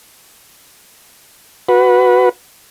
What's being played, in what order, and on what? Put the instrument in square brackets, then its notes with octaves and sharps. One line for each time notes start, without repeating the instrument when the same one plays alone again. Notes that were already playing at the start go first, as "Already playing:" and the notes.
[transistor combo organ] F#4 B4